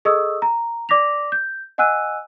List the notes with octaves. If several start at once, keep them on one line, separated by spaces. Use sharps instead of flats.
G#4 A4 D#5 C#6 D#6 E6
A#5
D5 D6 A#6 B6 F7
G6
D#5 F#5 G#5 E6 F#6 D#7